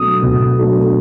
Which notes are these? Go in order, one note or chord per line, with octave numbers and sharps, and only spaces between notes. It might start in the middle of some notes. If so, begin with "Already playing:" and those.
Already playing: B2 F#3 A3 D4 D#6
B2
F#3 A3 D4